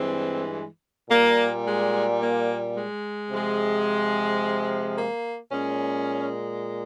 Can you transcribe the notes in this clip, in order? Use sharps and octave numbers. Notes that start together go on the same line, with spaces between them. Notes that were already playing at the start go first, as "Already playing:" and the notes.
Already playing: G2 E3 G#3 C4
A#2 G3 A#3
G#3
A#3
G#3
C3 F3 G#3
A#3
A#2 G#3 C#4